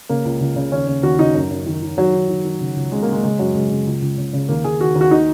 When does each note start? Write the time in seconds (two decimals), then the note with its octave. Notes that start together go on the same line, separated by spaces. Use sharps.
0.09 C#3 A#3
0.25 C#2
0.40 C#2
0.56 C#3
0.72 D#2 C#4
0.87 C#3
1.03 D#2 F#4
1.19 C#3 D#4
1.35 F#2
1.51 F#2
1.66 D#3
1.82 D#3
1.97 D#3 F#3
2.14 D#3
2.29 D#3
2.45 D#3
2.61 C#3
2.76 C#2
2.92 C#3 G#3
3.02 A#3
3.08 C#3 G#3
3.23 C#3 G#3
3.39 F#2 F#3
3.54 C#3 G#3
3.70 C#3
3.87 C#2
4.02 C#2
4.18 C#3
4.33 C#3
4.49 D#2 A#3
4.64 D#2 G#4
4.81 D#3 F#4
4.96 D#2
5.01 F#4
5.11 D#3 D#4